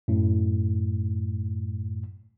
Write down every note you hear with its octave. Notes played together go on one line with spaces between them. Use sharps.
F#2 A2